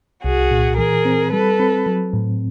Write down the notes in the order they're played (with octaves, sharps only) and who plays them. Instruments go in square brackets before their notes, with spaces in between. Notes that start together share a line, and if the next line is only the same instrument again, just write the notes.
[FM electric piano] C2 [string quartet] F#4 G#4
[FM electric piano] A#2
[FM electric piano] E3 [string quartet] G#4 A#4
[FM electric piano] C4
[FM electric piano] G3 [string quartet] A4 B4
[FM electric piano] C4
F#3
A2